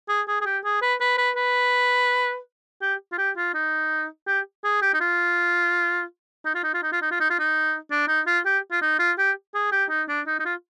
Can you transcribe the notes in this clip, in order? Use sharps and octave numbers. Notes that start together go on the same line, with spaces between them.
G#4
G#4
G#4
G4
G#4
B4
B4
B4
B4
G4
F4
G4
F4
D#4
G4
G#4
G4
D#4
F4
D#4
F4
D#4
F4
D#4
F4
D#4
F4
D#4
F4
D#4
D4
D#4
F4
G4
F4
D#4
F4
G4
G#4
G4
D#4
D4
D#4
D#4
F4